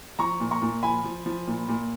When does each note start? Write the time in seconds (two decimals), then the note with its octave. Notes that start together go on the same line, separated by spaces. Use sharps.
0.19 F3 A#5 C#6
0.40 A#2
0.51 A#5 C#6
0.62 A#2
0.83 F3 G#5 B5
1.04 F3
1.26 F3
1.47 A#2
1.68 A#2